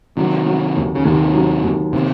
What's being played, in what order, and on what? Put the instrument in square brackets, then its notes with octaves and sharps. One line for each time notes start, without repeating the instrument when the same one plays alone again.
[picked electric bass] C3 D#3 [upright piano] F#3
[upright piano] F#3
D#2
[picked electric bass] C#3
[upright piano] D#2 [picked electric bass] C3 D#3
[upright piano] F#3
D#2
[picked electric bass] C3 D#3 [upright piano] C4